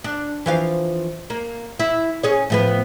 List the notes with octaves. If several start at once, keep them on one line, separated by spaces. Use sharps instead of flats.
D4
E3 F3 F5
A#3
E4
C#4 G#4 C#5
A2 F3 B3